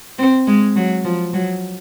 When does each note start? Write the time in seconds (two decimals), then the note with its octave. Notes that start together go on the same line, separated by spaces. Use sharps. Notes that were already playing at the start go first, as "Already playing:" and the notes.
0.19 C4
0.47 G#3
0.76 F#3
1.05 F3
1.34 F#3